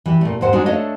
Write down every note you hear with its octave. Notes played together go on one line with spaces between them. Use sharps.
E3 G4
A#2 A3
D#2 G#2 C5 F#5
G#3 D4 D#4 F#4
A3 D4 A4 C#5 D#5 F5